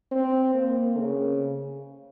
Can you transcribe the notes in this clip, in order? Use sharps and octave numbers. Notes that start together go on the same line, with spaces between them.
C4
A#3
C#3